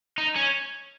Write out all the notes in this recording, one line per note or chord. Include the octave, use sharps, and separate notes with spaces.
D#4
C#4